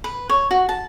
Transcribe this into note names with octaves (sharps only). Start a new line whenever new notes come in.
B4
C#5
F#4
A5